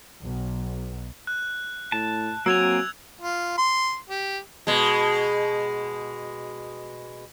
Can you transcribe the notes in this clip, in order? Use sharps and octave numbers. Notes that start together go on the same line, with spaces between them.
B1
F#6
A2 A5
F#3 A#3 C4 G#5 E6 G#6 F7
F4
C6
G4
B2 G#3